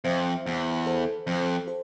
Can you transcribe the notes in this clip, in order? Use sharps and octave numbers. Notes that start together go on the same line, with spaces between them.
F2 C5 E5
E2
A4 C5
F2
A4 C5